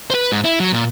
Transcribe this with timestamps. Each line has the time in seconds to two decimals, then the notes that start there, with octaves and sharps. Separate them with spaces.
0.10 B4 C5
0.32 G#2
0.44 E4
0.60 F#3
0.73 A#2